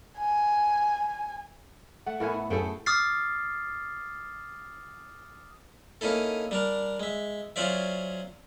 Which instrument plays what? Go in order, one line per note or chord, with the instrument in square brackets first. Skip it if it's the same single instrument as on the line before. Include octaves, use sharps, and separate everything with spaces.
[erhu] G#5
[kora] A3 [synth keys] F#5
[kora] A2 A3 B3 [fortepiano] A#4 G#5
[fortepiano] E4
[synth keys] F#2 [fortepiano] A3 G#4 A4 [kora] E5 F#5 G5
[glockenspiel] D6 D#6 F6 A6 C7
[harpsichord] A#3 C#4 D#4 E4 A4
G3 D4 A#4
G#3 E5
F#3 C#4 F4 C5 D5 E5